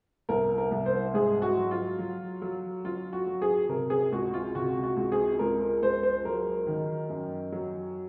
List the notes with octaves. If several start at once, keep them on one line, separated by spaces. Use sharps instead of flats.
C2 A#4
A#4
C2
C5
G#2 G#4
F#4
F#3
F4
F#3
F#3
F#3 F4
F#4
F#3
G#4
C3 A#4
G#4
C#2 F#4
F4
C3 F#4
F#4
C#2
G#4
C#2 A#4
A#4
C#2 C5
C5
F#3 A#4
D#3
F#2
F#3